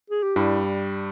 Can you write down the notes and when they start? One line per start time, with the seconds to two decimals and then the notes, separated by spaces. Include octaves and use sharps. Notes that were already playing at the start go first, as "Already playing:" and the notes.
0.10 G#4
0.23 G4
0.36 G2 G3 E4